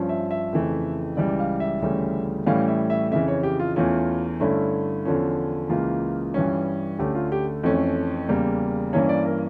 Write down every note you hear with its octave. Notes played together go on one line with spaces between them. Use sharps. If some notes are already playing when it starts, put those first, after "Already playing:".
Already playing: G2 F3 C#4
E5
E5
F2 C#3 E3 A3
C#2 C#3 E3 G3 D5
F5
E5
D2 C#3 E3 G3 C#4
A2 E3 G3 C#4 F5
E5
E5
F2 C#3 E3 E5
C#5
G4
F4
E2 E3 A3 C#4 F4
G2 D3 A3 C#4 E4
E2 D3 F3 C#4
C#2 C#3 E3 A#3 F4
G2 E3 G3 C#4
D2 D3 A3 C#4 G4
F4
G4
F2 E3 A3 C#4
E2 C#3 G3 A#3
G2 E3 A#3 C#4 C#5
D5
A#4